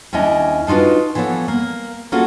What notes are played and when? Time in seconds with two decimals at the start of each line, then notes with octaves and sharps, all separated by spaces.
0.13 D#2 C#4 D4 E4 D#5
0.67 D4 D#4 F4 F#4 B4
1.15 E3 F3 B3 A4 C#5
1.48 A#3
2.12 A#3 C#4 F4 F#4 G#4 A4